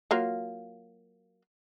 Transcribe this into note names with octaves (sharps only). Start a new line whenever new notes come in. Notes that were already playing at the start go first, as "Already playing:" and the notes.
F#3 A#3 F4